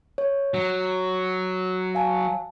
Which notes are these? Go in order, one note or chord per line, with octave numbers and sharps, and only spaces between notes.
C#5
F#3
F5 G#5 A5